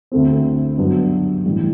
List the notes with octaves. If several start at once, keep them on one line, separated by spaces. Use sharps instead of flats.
D2 D3 A3 C4
G2 F#3 B3 F#4
A2 E3 G3